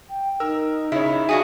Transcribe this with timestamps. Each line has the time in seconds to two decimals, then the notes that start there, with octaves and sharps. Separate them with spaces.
0.10 G5
0.40 D#4 A#4 E6
0.92 C#3 E4 C#5
1.29 D4 F#4 G#4 F5 G#5 B5